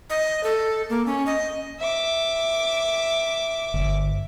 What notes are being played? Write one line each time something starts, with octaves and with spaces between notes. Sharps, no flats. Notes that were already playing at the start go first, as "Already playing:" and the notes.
D#5
A4
A#3
C#4
D#5
E5 D6
G1